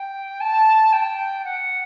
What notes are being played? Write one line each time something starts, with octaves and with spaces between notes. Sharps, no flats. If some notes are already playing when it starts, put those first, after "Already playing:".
Already playing: G5
A5
G5
F#5